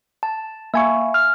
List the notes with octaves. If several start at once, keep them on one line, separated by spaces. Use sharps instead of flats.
A5
A#3 E5 G#5 C#6
F6